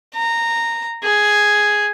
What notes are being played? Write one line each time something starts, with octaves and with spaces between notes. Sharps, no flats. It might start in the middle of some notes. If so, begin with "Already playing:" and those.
A#5
G#4